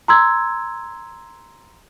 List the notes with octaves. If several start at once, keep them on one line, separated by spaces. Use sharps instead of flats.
A#5 C6 E6 G#6